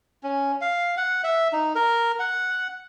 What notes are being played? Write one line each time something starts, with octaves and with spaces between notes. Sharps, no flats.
C#4
F5
F#5
E5
D#4
A#4
F#5